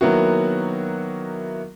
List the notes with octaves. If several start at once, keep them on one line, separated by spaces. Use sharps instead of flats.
D#3 F#3 A#3 B3 E4 F#4